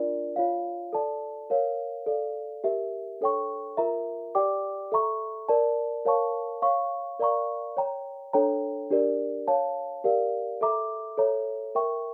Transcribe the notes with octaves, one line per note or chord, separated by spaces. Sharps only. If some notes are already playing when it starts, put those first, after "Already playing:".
Already playing: D4 F4 A#4 D5
F4 C#5 F5
A4 D5 A5
A#4 C#5 F5
A4 D5 F5
G4 A#4 E5
D4 A4 C#5 G5 C#6
F4 A#4 E5 A#5
G4 D5 G5 D6
A4 E5 A#5 C#6
A#4 D5 A5
A#4 C#5 F5 A5 C#6
C#5 F5 C#6
A#4 D5 F5 A#5 C#6
C#5 G5 A#5
D4 A4 C#5 G5 A#5
D4 G4 A#4 D5
C#5 F5 A5
G4 A#4 D5 F5
A4 E5 A#5 D6
A4 C#5 E5 A#5
A#4 E5 G5 C#6